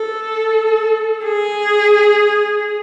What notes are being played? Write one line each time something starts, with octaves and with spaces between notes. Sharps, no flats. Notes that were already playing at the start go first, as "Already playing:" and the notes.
Already playing: A4
G#4